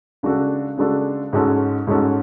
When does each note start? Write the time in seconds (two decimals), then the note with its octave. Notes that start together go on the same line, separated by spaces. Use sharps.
0.23 C#3 G#3 D4 F#4 A4
0.78 C#3 G#3 D4 F#4 A4
1.33 G#2 G#3 C#4 F#4 A4
1.87 G#2 G#3 C#4 F#4 A4